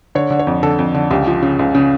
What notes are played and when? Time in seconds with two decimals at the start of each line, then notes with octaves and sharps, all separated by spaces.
0.15 D3 C#5
0.30 D3
0.39 C#5
0.47 F2
0.63 D3 A4
0.79 F2
0.94 D3
1.10 C#2 G4
1.26 F3
1.43 C#3
1.59 C#2
1.75 C#3